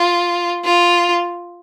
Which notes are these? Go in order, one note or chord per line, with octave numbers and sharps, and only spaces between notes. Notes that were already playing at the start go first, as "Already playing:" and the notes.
Already playing: F4
F4